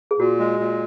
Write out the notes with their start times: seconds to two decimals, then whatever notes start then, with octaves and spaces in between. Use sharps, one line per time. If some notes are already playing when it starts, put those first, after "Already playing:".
0.11 G#4
0.19 A#2 F#4
0.39 G#3
0.60 A#2